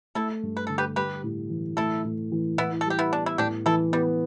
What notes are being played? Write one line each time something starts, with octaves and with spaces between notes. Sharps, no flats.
A3 E4 A4
G2
B4
D3 A4
G4 B4
G3 G4 B4
A2
E3
A3 E4 A4
A2
E3
A2 B3 E4
A4
G3 G4
B3 E4
B3 D4
E4
A2 D4 G4
E3 E4 A4
G3 B3